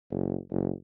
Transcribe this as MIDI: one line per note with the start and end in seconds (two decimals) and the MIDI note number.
0.11 0.36 30
0.51 0.71 30